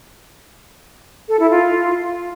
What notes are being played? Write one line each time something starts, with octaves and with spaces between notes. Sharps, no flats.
A4
E4
F4